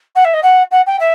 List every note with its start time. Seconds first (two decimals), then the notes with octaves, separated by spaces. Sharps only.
0.15 F#5
0.24 E5
0.33 D#5
0.42 F#5
0.71 F#5
0.86 G5
0.99 E5